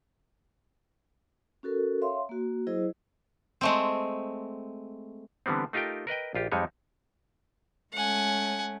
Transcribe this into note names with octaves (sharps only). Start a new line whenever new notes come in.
C#4 F#4 A4 A#4
C#5 E5 F5 C6
A#3 F#4
F#3 E4 G#4 C5 D#5
G#3 A3 C4
D3 E3 G3 B3 C4
A3 D#4 F4 G4 A#4 G5
A#4 B4 D#5 G5
A#1 F4 G4
F2 G3 G#3 D#4 C#5
G#3 A3 C#4 F#5 G#5